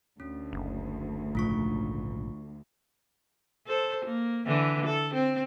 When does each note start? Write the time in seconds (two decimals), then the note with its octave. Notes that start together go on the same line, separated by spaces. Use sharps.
0.20 D2 C#4
0.53 F#1
1.35 A#1 G#2 C#3 A3 F4 C#6
3.67 A4 C5
4.05 A#3
4.46 D3 E3
4.85 A4
5.14 C4